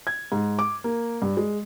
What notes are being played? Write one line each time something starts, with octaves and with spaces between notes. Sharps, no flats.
G#6
G#2
D6
A#3
G2
G#3